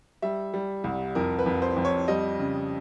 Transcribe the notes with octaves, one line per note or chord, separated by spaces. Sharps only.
G3 E5
G3
C2
F2 A#4
B4
F2
C5
F2
C#5
G3 D#5
C#3